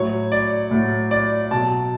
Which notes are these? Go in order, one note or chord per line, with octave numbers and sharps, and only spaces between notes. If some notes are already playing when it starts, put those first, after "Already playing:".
Already playing: A2 F#3 C#5
D5
A2 F#3
D5
B2 F#3 A5